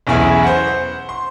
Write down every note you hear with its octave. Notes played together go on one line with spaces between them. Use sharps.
B1 E2 C#4 E4 G#4 B4
C5 F#5
C6